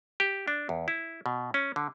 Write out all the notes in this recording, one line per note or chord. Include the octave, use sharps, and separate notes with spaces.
G4
D4
E2
E4
B2
C#4
D3